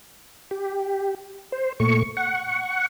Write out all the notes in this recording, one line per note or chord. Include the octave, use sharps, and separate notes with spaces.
G4
C5
A#2 A3 C#6
F#5 C#6